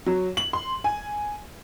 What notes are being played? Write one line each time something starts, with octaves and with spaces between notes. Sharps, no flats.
F#3
F#7
C6
G#5